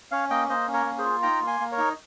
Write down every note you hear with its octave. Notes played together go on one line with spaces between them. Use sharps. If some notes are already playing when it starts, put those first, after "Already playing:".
C#4 C#5 F5
A#3 D#5 G5
A#3 C5 D#5
C#4
A#4 C#5
A#3
G#4 C5
F4
D#4 G5 A#5
A#3
G#5 C6
A#3
A#4 C#5
D#4